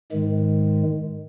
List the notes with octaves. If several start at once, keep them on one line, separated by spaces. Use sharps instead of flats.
G#2 D#3 G#3